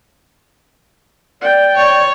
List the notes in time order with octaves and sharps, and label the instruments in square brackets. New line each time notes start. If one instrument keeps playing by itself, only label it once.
[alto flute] D5 [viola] G5
[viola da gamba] C#5